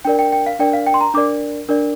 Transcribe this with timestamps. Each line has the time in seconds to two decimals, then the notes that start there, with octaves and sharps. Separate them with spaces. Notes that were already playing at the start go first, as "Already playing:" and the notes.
0.05 D4 A#4 D5 G5
0.19 G5
0.32 G5
0.46 F5
0.59 D4 A#4 D5 G5
0.73 F5
0.86 G5
0.94 C6
1.01 A#5
1.14 D4 A#4 D5 D6
1.69 D4 A#4 D5